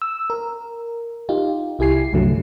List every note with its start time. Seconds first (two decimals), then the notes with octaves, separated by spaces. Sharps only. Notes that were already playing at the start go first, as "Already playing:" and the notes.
0.02 E6
0.30 A#4
1.29 D#4 F4 G4
1.79 C2 E4 G4 G#5 C7
2.13 C2 F#2 D3 F#3 A3